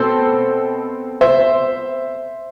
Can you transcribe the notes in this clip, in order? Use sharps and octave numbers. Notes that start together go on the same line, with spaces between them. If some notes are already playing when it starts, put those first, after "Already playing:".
Already playing: B2 A3 C4 A4 C5
C5 E5